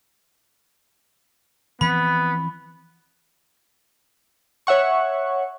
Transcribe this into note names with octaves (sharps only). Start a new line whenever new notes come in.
E3 F3 B3 C4 B5
C#5 E5 F#5 C#6